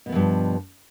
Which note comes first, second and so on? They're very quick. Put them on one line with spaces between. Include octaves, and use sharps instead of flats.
B2 B3 E3 G2 F3